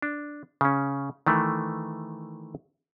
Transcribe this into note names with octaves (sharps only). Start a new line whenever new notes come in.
D4
C#3 C#4
D#3 E3 A3